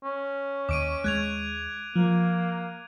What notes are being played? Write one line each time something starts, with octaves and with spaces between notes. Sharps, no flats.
C#4
D#2 D6 D7 D#7
D#2 G#3 F#6 G#6 F7
F3 A#3